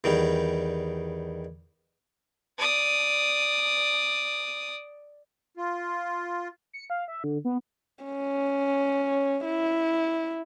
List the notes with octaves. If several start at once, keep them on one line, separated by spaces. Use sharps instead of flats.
E2 D#3 G3
D5 D#6
F4
C#7
F5
E5
D3
B3
C#4
E4